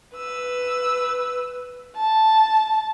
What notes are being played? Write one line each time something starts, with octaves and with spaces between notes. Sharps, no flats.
B4 E6
A5